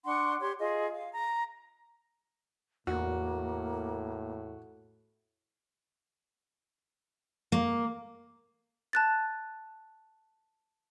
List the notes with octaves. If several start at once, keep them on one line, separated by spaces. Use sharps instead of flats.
D4 F#5 C6 C#6
G4 C#5 C6
F4 G#4 D#5
F5
A#5
E2 A2 A#3 F#4
A#3
A5 F#6 A6